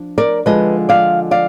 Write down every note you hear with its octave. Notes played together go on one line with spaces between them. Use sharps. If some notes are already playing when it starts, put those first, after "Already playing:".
Already playing: F3 D4
A#4 D5
D3 F3 G#3 B4 D#5
D5 F5
D5 F5